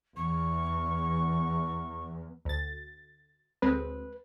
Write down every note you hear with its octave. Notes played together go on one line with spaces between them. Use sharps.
E2 C#6
D2 A6
D2 G#3 C4 B4